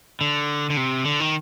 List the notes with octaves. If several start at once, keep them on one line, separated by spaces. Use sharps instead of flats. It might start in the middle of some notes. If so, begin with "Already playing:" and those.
D3
D3
C3
D3
D#3